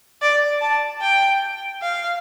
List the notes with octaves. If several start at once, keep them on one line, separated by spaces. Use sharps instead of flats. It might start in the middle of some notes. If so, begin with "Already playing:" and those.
D5
A5
G5
F5